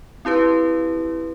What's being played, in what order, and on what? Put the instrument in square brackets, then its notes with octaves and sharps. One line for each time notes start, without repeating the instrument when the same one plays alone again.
[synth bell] C4 E4 G4 B4